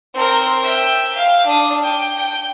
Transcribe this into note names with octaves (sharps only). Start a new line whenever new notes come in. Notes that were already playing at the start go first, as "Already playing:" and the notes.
C4 A#4
E5 G5
F5
D4 D#6
G5
G5